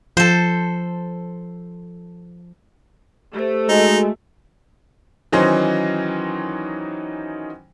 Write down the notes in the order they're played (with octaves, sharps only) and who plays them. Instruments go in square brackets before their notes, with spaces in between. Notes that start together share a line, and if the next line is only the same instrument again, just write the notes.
[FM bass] F3 [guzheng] A4 C5
[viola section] A3 [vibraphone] G4 C5
[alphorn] G#3 [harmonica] D#4 [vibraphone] F#4
[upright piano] D#3 E3 F#3 C#4 D#4 C5